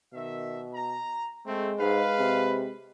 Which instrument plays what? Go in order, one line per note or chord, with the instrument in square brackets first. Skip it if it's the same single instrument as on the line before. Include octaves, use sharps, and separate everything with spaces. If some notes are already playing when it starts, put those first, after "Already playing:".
[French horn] B2 [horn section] D#3 E5
[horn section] A#5
[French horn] G#3 [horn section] A3 [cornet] C4
[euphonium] G#2 [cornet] B4 [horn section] F5
[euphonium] C3